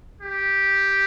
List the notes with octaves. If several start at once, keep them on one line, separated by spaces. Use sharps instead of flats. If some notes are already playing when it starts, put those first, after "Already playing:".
G4